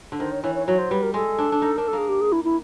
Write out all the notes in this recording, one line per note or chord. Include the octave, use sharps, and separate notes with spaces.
D3
D#3 C5
C#5
E3 C#5
C#5
F#3 C#5
C5
G3 B4
A#4
G#3 A4
D4
D4
D#4
D4 A#4
A4
A#3 G#4
G4
G#4
E4
E4